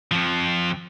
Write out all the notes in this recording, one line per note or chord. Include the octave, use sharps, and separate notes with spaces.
F2 F3